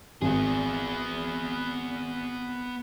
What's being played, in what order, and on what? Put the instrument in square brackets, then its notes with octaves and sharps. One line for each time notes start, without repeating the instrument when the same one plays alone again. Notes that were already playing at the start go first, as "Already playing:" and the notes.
[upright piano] G#1 [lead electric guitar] B3 G#4